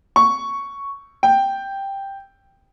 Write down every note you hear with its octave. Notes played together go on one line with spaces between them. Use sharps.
C#6
G5